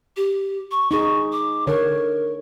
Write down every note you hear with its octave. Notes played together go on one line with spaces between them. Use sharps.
G4
C#6
D#4 G#4 C#6
D6
D3 A#4 C#5